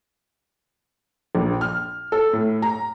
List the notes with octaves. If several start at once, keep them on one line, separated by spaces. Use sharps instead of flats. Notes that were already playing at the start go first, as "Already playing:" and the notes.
A#1
F6
A4
A2
A#5